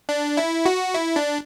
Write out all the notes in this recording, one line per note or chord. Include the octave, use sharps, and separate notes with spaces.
D4
E4
F#4
E4
D4